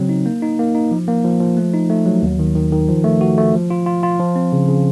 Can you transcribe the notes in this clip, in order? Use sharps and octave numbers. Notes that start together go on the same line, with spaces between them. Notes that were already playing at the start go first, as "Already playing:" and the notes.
Already playing: C#3 F#3 C4
D#4
A#3
D#4
A#3
D#4
F3
A#3
F3
F3
A3
D#4
A3
F#3
D#2
D#3
D#3
D#3
F3
A3
F#4
A3
F3
F4
F4
F4
F3
C4
C#3
C#3